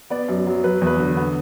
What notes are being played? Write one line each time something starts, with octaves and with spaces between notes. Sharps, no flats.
B3 D5
F#2
F#3
F#3 B4
E2
B4
D3
B3